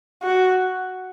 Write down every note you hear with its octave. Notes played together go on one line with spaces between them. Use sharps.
F#4